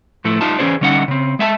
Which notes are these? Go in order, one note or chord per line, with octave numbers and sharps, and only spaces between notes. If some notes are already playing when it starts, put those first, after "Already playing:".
A2 F3 A3 E4
G3 D#4 F4 A5
E3 A3 C#4 G#4 C5 D5
D3 G3 C#4 D#4 D#5 F#5
C#3 C4
G#3 E5 G#5 A5